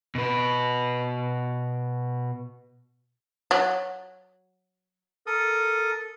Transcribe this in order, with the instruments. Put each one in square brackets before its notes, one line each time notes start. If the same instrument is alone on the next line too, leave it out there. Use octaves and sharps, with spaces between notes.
[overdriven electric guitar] B2 B4
[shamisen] F#3
[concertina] A4 A#4 D#6